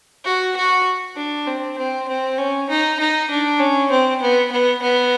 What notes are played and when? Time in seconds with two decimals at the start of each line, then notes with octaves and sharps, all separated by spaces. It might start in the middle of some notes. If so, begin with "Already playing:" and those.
0.25 F#4
0.56 F#4
1.16 D4
1.47 C4
1.78 C4
2.09 C4
2.38 C#4
2.70 D#4
3.00 D#4
3.31 D4
3.60 C#4
3.91 C4
4.22 B3
4.52 B3
4.82 B3